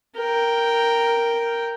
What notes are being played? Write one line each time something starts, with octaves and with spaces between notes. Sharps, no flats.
A#4 G5